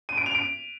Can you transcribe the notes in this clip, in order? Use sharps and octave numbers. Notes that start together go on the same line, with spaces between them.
D#7
D7
F7
D7